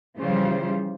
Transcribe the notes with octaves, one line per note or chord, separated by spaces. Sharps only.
C#3 E3 F3 G3 F4 C5